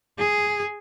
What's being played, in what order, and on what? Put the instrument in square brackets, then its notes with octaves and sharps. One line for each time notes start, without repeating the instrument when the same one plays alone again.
[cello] G#4